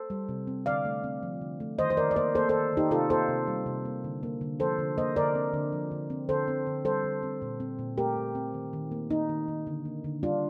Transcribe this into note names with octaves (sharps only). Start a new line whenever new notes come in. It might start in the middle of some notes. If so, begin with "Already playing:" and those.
Already playing: A4 C5
G3
C3
C4
D3 D5 F5
A3
C4
F3
D3
A3
D#3 C5 D#5
C5
D#3 A#4 D5
D5
A#3 C5 D#5
A#3 A4 C5
D#3 A4 C5
D#3 D#4 G4
C3 F4 A4
A#3 A4 C5
C3
G3
C3
A#3
D3
A#3
D3
F3 A4 C5
D3
A#3 C5 D#5
D3 A#4 D5
C4
D3
F3
D3
C4
D3 A4 C5
C4
D3
G3 A4 C5
D3
C4
A#2
C4
A#2
A3 G4 A#4
A#2
C4
D#3
D#3
A#3
A#3 D#4
D#3
D#3
D3
A#3
D3
G3 D4 F4